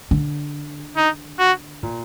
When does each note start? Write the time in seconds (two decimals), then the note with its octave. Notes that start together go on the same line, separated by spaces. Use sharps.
0.11 D3
0.97 D#4
1.39 F#4
1.83 A#2